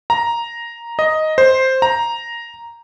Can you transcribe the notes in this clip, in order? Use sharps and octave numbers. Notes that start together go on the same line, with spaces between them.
A#5
D#5
C5
A#5